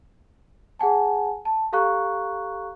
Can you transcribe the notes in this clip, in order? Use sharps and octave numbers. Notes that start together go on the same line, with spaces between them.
G#4 F#5 G#5 A5
A5
G4 A4 F5 A#5 C#6 F#6